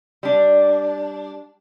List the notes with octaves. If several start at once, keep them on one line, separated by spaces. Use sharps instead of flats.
G3 D4